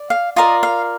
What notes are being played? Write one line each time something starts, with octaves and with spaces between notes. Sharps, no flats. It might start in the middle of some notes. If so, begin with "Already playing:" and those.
Already playing: D5
F5
F4 A#4 D5 D#5
F5